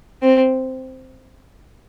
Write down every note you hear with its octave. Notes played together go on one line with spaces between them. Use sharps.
C4